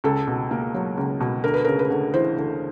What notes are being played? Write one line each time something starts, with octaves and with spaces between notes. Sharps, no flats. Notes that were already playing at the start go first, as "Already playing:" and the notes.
C#2 A4
B2
A#3
F#3
C#2
B2
D2 A#4
B4
C#3 A#4
B4
D2
E3 C5
D2